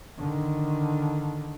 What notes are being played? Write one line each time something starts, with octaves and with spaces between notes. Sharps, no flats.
D3 D#3